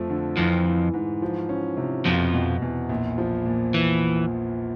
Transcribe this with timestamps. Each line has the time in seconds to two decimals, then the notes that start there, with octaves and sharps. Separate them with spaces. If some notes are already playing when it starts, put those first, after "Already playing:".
Already playing: F2 F3 A3
0.10 D3
0.37 F2 E3 F3
0.65 E3
0.94 G#2
1.22 F3
1.49 C#4
1.77 C3
2.05 F2 B2 F3
2.34 B2
2.62 E2
2.89 A#1
3.18 F3
3.46 A#2
3.74 E3